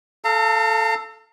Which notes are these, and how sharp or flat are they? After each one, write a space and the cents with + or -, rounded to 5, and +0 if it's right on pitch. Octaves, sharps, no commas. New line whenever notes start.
A4 +0 F5 -10 A#5 -45